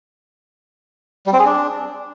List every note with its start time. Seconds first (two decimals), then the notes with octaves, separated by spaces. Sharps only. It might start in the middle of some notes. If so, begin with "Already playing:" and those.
1.26 G3
1.33 C4
1.40 G#4
1.46 D4